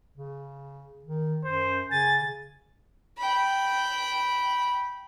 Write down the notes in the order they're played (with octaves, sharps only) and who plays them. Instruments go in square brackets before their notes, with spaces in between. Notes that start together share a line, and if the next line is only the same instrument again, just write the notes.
[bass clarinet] C#3
D#3
[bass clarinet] F#2 [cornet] C5
[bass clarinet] C#3 [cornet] G#5 [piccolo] A6
[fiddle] G5 B5